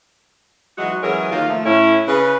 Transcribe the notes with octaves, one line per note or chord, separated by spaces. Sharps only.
E3 F#3 G#3 D#4 F#4
E3 F#3 G#3 C#4 G#4 A#4
D#3 A#3 D#4 F4
F3 A3
A2 C#4 E4
C#3 B4